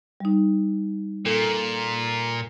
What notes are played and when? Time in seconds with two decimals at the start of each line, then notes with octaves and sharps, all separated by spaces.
0.20 G3 D#4
1.25 A#2 A4